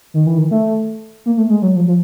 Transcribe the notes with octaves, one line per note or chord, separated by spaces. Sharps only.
D#3
E3
D#3
A3
A#3
A3
G#3
F#3
F3
F3